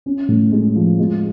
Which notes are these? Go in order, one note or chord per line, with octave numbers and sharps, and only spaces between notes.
C#4
A2
G#3
F3
G#3